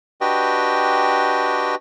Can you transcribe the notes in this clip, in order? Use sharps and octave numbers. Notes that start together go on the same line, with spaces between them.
D4 F#4 G4 B4 D#5 G5